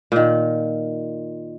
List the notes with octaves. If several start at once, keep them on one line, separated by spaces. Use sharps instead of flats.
A#2 D#3